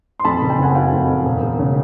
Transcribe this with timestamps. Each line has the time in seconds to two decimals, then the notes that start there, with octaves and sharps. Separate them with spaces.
0.20 C6
0.25 F2 A5 B5
0.42 F#1
0.50 G5 A5
0.59 C#3 F#5 G#5
0.75 F#3 F5 G5
0.92 F2
1.08 F2
1.25 E1
1.42 E1
1.59 C#3